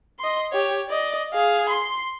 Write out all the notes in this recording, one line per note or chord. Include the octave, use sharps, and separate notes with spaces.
D#5 C6
G4 C#5
D5 D#5
G#4 F5
C6